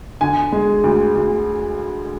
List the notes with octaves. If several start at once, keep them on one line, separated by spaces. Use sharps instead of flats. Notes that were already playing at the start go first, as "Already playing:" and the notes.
D3 G#5
G#3
D2
D2